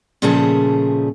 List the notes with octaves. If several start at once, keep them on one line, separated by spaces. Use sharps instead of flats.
A#2 C#3 F3 A3 G#4 A5